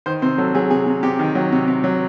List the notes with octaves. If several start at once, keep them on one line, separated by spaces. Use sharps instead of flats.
D#3 C5
C3 C5
F#3 A4
F#3 G#4
C3 G#4
C3
C3 G4
D#3
F#3
C3
C3
F#3